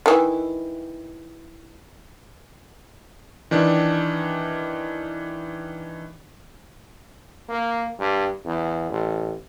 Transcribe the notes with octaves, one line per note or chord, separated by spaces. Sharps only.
D#3 E3
D#3 E3 D4
A#3
G2
E2
A1